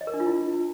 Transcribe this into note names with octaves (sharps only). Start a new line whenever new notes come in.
D#5
A#4
D4
F4
E4